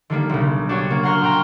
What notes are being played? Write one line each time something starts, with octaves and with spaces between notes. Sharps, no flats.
D3 D#3 G3 A#3
B1 C#3
D4 F#4 G4 C#5
A#3
F#5 A#5 C6 C#6 F6
A#2 G5 A#5